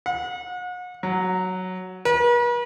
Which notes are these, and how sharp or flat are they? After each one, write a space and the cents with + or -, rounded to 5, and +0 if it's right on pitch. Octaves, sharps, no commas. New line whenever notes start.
F#5 -40
F#3 +0
B4 -45